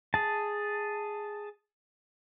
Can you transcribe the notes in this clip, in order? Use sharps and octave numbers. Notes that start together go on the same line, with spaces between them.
G#4 A5